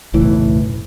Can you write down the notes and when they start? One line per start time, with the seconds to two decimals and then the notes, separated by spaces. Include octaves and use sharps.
0.14 F#1 B1 A2 E3